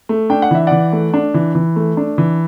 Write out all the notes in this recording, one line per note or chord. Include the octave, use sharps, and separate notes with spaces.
A3
D4 G5
F#5
E3 E5
E3 D5 F#5
A3
D4
E3
E3
A3
D4
E3